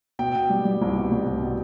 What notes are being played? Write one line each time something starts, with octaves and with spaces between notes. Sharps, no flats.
B2 G5
B2
G3
G3
C2
B2
C2
C2
B2